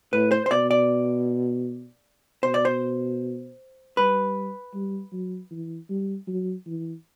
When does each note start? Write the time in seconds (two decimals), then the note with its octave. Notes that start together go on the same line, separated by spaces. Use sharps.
0.13 A2 B4
0.31 C5
0.46 C5
0.51 B2 D5
0.71 D5
2.43 B2 C5
2.54 D5
2.65 C5
3.97 G3 B4
4.74 G3
5.12 F#3
5.51 E3
5.89 G3
6.27 F#3
6.67 E3